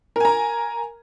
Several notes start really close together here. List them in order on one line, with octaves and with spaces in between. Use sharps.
A#4 G#5 A#5